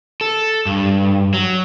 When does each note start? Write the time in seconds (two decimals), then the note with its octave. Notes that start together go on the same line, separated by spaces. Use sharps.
0.21 A4
0.66 G2
1.34 F#3